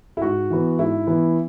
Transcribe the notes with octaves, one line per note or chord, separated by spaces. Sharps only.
E4
G#2 F#4
E3 B3
G#2 E4
E3 B3